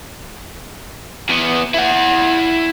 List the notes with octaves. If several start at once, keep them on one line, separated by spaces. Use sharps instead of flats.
E2 B3
E4 F#5